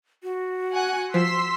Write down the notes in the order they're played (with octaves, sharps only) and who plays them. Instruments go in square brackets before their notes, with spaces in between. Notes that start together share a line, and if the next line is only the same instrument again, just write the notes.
[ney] F#4
[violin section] F#5 G#5 F#6
[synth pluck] F3 [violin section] C6 E6 B6